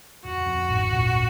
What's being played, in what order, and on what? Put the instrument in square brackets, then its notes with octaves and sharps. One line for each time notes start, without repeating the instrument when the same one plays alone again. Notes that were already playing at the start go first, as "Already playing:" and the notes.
[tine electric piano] F2 [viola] F#4
[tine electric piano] F2
G#1 G#2
A#1 A#2